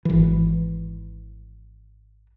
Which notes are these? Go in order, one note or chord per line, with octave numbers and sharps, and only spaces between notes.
G#1 E3